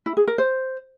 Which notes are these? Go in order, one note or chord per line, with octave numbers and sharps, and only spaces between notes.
E4
G#4
A#4
C5